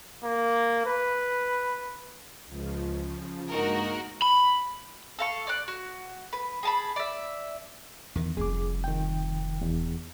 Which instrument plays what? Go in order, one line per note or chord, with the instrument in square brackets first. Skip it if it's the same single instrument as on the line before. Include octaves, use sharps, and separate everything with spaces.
[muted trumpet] A#3
B4
[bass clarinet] C#2 [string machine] C#3 F3
[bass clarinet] G2 [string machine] G#3 A#3 [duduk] D#4 [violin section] F#4 A#4
[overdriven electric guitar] B5
[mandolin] A4 F5 C#6
D5 F#6
F#4
B4
G#4 A5 B5
D5 E5
[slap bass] E2 D#3
[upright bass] F1 G3 [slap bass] F2 [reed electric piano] G#4 D6
[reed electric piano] D#3 G5
E2